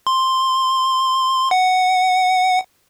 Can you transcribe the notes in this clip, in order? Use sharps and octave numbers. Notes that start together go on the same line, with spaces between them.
C6
F#5